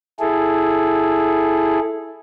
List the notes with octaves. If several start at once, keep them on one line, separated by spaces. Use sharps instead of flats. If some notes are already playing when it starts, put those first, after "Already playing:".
E4 G#4 A4